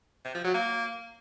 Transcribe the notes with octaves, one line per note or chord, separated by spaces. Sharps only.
C3
F3
F#3
A#3